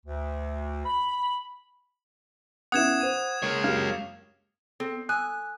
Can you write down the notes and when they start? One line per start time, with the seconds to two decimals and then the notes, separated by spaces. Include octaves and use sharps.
0.06 D2
0.86 B5
2.72 B3 C#4 E4 F#5 D#6 G#6 E7
3.01 C5 D#7
3.43 G#3 A#3 C#5 F6
3.64 F#2 A#3 G4 F5
4.80 C4 A4
5.09 G#5 D#6 E6 F#6